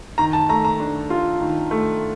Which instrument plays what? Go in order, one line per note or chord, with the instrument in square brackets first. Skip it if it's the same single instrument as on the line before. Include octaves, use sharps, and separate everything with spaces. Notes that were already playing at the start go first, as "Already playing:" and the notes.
[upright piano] D#3 A#5
A5
A3 A#5
A#5
D4
F4
D#3
A3